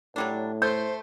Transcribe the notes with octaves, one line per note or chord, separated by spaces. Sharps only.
A2 F#3 G3 D4
A3 C5 G6